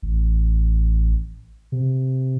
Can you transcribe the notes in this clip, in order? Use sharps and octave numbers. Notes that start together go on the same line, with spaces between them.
A1
C3